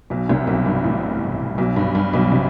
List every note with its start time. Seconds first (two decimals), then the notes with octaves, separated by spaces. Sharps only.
0.10 B1 B2
0.29 C2 C3
0.47 B1 B2
0.66 G2
0.84 A1 A2
1.58 B1 B2
1.76 G2
1.95 G2
2.13 B1 B2
2.32 C3